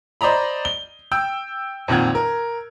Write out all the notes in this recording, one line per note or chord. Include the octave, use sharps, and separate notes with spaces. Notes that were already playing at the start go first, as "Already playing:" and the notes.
C5 D5 D#5 A#5 B5
G7
G5 E6 G6
F2 A#2 D#3 F#5 G#6
A#4